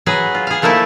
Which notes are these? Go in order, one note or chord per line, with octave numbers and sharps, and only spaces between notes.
F#3 F#4 G#4 B4
F4
G#4 F5
F3 A3 A#3 D#4 E4